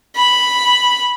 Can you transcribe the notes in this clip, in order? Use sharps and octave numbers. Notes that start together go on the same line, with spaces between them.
B5